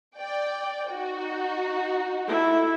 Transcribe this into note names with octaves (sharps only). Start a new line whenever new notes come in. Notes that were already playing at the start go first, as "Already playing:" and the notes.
D5 G5
D#4 F#4
E4 A4